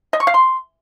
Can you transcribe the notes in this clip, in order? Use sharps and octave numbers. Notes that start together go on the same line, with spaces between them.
D#5
C#6
F5
C6